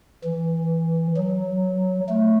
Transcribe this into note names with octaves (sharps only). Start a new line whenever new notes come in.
E3
F#3
A3